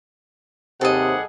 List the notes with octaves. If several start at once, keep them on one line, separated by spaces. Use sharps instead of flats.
D#2 C3 G3 G#4 A4 D#5 F#5